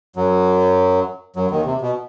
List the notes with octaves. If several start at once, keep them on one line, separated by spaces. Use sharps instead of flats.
F#2 F#3
F#2 F#3
D#2 D#3
C3
B2